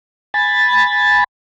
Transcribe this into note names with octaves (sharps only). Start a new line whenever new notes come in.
G#5 B5 A6